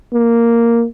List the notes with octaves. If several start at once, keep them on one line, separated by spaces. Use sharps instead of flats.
A#3